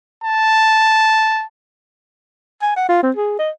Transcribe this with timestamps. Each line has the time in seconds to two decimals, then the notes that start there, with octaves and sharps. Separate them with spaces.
0.24 A5
2.62 G#5
2.76 F#5
2.89 F4
3.03 C4
3.16 G#4
3.39 D#5